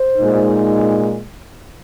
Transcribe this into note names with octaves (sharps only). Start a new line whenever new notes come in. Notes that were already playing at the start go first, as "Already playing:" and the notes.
Already playing: C5
A#2 G#3 D#4